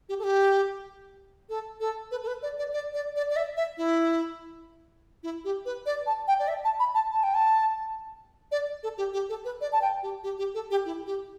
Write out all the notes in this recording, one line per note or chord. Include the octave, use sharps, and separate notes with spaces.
G4
A4
G4
A4
A4
B4
A4
B4
D5
D5
D5
D5
D5
D5
E5
E5
E4
E4
G4
B4
D5
A5
G5
D5
E5
A5
B5
A5
A5
G5
A5
D5
A4
G4
G4
A4
B4
D5
A5
G5
G4
G4
G4
A4
G4
E4
G4